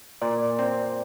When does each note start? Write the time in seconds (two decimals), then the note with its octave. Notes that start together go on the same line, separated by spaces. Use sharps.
0.22 A#2 D5
0.59 C4